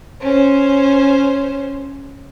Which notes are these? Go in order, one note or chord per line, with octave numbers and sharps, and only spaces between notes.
C#4 C5